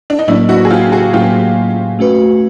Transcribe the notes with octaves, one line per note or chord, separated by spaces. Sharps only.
D4
D#4
A2 F#3 A#3 C#4 D4 E4
E4 F#4
G#4
F4 G4
F#4 G#4
A2 F#3 A#3 C#4 F4 G4
A3 C#4 F#4 B4